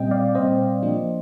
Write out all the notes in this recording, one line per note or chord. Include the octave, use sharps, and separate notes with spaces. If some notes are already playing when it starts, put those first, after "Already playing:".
Already playing: A#2 G3 C4 D#5 G5
D5 F5
A#2 G3 C4 C5 D#5
F3 A#3 D4